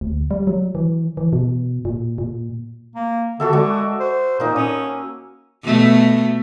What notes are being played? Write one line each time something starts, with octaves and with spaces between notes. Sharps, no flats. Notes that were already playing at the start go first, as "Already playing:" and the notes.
D2
G3
F#3
E3
E3
B2
A#2
A#2
A#3
D3 F#4 A4 E5
G#3 F#4 D5 C#6
C5
A#2 A#3 D#4
C#4 D#6 E6
B2 A3